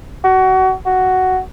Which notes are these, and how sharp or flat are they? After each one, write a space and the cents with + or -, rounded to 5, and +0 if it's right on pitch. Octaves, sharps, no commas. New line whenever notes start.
F#4 +25
F#4 +5